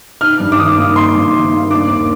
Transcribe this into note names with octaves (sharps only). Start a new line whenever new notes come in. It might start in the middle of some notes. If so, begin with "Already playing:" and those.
D#4 F6
G2
D6
D#3 D#6
A#3
D#4 C6
G2
D#3
A#3
D4 D6
D#2